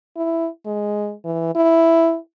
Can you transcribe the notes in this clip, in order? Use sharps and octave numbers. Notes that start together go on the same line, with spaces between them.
E4
G#3
E3
E4